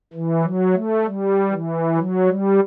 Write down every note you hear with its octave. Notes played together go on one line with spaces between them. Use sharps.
E3
F#3
A3
G3
E3
F#3
G3